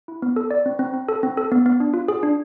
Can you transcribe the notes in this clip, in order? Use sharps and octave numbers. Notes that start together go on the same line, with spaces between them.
E4
B3
A4
D5
C4
C4
C4
A4
C4
A4
B3
B3
D4
F4
G#4
D4